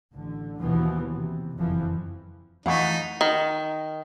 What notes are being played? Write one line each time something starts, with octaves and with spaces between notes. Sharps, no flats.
A1 D3
D#2 B2 E3 F3 B3
C3
F#1 F2 E3 F3
E3 F3 A3 D#4 F5 F#5 G#5 C#6
D#3